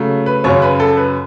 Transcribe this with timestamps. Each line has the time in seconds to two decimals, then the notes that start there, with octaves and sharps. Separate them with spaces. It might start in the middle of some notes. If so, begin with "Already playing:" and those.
Already playing: C#3 F#3 A3
0.26 B4
0.44 F#2 C#3 F#3 C#5
0.62 B4
0.80 A4
0.97 B4